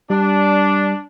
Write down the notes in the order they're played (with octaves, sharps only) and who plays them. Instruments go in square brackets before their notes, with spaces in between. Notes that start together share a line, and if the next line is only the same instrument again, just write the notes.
[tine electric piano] G3 [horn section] D4